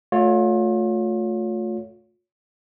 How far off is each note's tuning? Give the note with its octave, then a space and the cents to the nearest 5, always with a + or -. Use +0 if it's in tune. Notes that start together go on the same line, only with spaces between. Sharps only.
A3 +0 F4 +35 C#5 +20